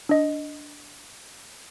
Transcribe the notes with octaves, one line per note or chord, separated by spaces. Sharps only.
D4 D#5